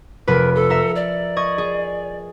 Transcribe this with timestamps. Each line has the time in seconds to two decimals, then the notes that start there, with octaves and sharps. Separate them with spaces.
0.28 F1 A#4 B4
0.55 A4
0.70 A#4 E5
0.95 D5
1.37 D#5 C#6 G#6
1.58 G#4